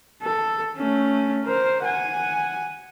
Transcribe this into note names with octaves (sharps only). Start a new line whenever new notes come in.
A4
A3 C#4
A#4 C5
F#5 G#5